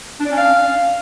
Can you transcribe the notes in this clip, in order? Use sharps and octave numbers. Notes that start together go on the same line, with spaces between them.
D4
D5
C#4
F5